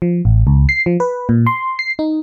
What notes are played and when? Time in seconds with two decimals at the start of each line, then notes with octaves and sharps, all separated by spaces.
0.02 F3
0.25 A1
0.47 C#2
0.69 C7
0.86 F3
1.00 B4
1.29 A#2
1.47 C6
1.79 C7
1.99 D#4